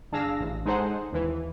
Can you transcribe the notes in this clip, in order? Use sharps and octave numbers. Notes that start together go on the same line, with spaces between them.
G1 D4 G#4 F5 E6 A#6
A1
G#3 D#4 G#4 A4 C5 F#5
D#2 E3